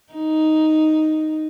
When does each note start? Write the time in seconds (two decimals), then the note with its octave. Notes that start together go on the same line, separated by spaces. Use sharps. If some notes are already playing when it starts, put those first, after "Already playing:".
0.13 D#4